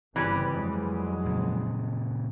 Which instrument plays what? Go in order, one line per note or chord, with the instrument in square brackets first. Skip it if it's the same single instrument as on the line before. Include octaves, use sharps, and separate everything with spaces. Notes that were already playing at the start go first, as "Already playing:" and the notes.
[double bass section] G1 C#3 C4 [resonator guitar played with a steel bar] E3 G3 B4
[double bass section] F2 F#3 G#3
[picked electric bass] A#2 C#3